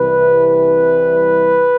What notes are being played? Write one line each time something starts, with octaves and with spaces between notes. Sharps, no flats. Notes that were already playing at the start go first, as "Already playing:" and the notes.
Already playing: C2 C3 E3 G3 B4